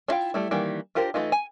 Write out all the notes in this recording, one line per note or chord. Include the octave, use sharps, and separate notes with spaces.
D4 E4 F4 F5 G5
G3 A3 E4
D#3 E3 G3 A#3
D4 F4 G4 A#4 C5
E3 G#3 A3 D#4 F4
G#5